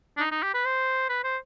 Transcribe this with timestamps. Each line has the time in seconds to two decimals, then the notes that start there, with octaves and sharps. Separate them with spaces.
0.17 D4
0.20 D#4
0.31 D#4
0.43 G4
0.54 B4
0.65 C5
1.09 B4
1.24 C5